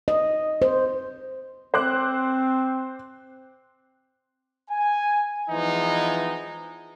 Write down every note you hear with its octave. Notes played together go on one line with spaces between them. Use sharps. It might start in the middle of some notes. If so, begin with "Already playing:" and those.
D#5
C5
C4 C5 D6 F#6
G#5
E3 F3 G#3 B3 D#4